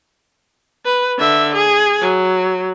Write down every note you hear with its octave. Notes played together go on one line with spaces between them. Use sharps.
B4
D3 E5
G#4
F#3